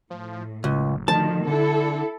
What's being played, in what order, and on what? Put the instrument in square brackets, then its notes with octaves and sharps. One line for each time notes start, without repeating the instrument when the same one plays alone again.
[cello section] A2 [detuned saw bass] F3
[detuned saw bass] F#1 [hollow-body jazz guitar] C#2
[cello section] D2 D#3 [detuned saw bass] F3 [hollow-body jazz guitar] A5
[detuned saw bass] D3 [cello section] E4 A4